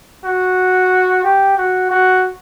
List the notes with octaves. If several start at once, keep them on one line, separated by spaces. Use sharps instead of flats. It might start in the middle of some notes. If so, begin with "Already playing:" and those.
F#4
G4
F#4
F#4